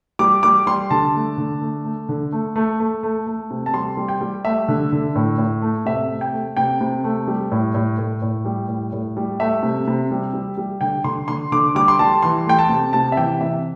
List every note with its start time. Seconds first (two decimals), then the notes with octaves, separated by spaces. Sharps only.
0.19 G3 D6
0.43 G3 D6
0.67 G3 C6
0.90 D3 A5
1.15 A3
1.38 D3
1.61 A3
1.85 A3
2.09 D3
2.32 A3
2.56 A3
2.80 A3
3.03 A3
3.27 A3
3.51 C3
3.66 A5
3.73 G3 C6
3.97 G3
4.08 G5
4.21 G3
4.45 A3 E5
4.68 D3
4.92 D3
5.16 A2
5.38 A2
5.62 A3
5.86 C3 E5
6.10 A3
6.21 G5
6.33 A3
6.57 C3 G5
6.81 C3
7.04 A3
7.27 G3
7.52 A2
7.75 A2
7.98 A2
8.22 A2
8.45 G3
8.69 A2
8.93 A2
9.17 G3
9.40 A3 E5
9.63 C3
9.88 C3
10.11 G3
10.33 G3
10.57 G3
10.81 D3 G5
11.04 D3 C6
11.28 D3 C6
11.52 D3 D6
11.75 G3 D6
11.88 C6
11.99 G3 A5
12.22 E3 C6
12.46 A3 G5
12.59 A5
12.69 C3
12.93 C3 A5
13.12 E5
13.17 E3 G5
13.41 C3 E5